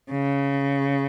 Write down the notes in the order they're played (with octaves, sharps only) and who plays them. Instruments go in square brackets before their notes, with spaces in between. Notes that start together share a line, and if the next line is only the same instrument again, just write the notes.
[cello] C#3